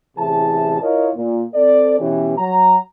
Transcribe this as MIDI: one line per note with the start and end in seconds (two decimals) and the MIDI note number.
0.17 0.80 33
0.17 0.80 45
0.17 0.80 48
0.17 0.80 52
0.17 0.80 68
0.17 0.80 81
0.82 1.10 64
0.82 1.10 65
0.82 1.10 70
0.82 1.10 73
0.82 1.10 75
1.15 1.43 46
1.54 1.97 60
1.54 1.97 69
1.54 1.97 74
2.00 2.35 47
2.00 2.35 52
2.00 2.35 61
2.00 2.35 67
2.37 2.76 54
2.37 2.76 82